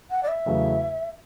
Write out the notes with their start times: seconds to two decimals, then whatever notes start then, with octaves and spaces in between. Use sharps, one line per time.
0.11 F#5
0.23 D5
0.28 E5
0.46 E2 C#3 F#3 A3